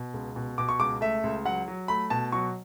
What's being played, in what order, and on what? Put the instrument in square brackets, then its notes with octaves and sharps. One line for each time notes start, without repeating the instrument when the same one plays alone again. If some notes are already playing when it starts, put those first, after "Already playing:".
Already playing: [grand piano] B2
C#2
B2
B2 D6
C#6
C#2 D6
A3 E5
C#2
F#3 F#5
F#3
A3 B5
B2 A5
F#3 C#6